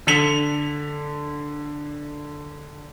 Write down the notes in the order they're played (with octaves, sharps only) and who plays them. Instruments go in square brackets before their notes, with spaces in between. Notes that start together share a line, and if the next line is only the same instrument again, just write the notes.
[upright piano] D3 B6 C#7 F7